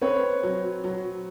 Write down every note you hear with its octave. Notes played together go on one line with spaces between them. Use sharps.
C4 B4 C#5
F#3
F#3